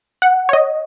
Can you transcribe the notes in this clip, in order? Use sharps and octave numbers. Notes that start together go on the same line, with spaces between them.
F#5
C#5
D#5